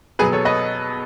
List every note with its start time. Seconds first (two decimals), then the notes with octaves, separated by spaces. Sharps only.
0.19 B2 F#3 G#4 B4
0.32 A4 C#5
0.45 B4 D#5